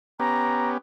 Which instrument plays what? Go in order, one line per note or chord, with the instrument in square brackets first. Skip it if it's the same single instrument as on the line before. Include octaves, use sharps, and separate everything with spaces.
[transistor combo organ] B3 C#4 G4 [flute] A#5